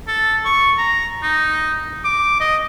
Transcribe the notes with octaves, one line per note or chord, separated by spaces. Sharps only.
A4
C#6
A#5
D#4
D6
D#5